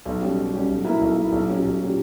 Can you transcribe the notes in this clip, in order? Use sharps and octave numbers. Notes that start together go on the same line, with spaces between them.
B1
B2 G3 C#4 G4
B1
B2 G3 C#4 G4
B1
B2 A#3 E4
B1
B2 A#3 E4
B1
A#2 F#3 C#4 G4
B1
A#2 F#3 C#4 G4